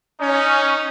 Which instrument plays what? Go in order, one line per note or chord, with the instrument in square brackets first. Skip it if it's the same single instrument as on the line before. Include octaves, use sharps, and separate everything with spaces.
[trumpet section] C#4 [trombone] D#4